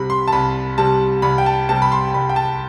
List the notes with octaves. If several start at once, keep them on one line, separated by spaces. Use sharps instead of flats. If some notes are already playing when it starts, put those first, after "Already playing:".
Already playing: C2 C3 G3 B5
C6
A5
C2 B5
C3 G3 A5
C2 B5
G5
A5
C3 G3 A5
B5
C6
C2 B5
G5
A5